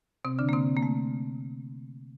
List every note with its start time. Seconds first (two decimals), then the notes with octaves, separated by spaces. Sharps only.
0.25 C3 C4
0.39 D3 D4
0.49 A#3
0.53 C3 C4
0.77 A#3
0.83 A3